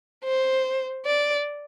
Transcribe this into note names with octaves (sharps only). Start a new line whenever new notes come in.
C5
D5